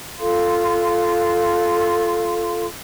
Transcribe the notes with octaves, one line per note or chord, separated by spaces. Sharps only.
F4 A4 F5 C6